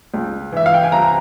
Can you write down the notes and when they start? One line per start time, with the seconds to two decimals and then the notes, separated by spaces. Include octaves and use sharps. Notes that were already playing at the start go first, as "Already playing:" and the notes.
0.14 C#2
0.52 E3 E5
0.66 F5
0.74 G5
0.83 G#5
0.92 C2 A#5